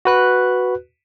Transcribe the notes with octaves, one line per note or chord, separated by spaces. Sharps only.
F#4 B4 F#6